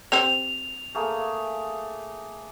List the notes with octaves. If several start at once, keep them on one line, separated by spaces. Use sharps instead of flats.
C4 G4 C5 F7
A3 A#3 G#4